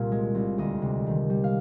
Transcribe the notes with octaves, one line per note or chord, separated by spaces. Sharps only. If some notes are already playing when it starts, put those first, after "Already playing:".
Already playing: C2 A#2 F5
G#3
C2
D2 D#5
C3
D#3
G3
F5